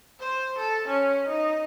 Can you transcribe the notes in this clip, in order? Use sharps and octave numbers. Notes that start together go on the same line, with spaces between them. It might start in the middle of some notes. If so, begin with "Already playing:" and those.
C5
A4
C#4
D#4